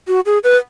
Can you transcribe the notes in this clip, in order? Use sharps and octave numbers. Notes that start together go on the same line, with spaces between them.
F#4
G#4
B4